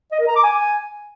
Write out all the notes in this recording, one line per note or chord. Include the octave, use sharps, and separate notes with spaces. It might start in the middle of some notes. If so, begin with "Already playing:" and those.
D#5
A#4
A#5
D6
G#5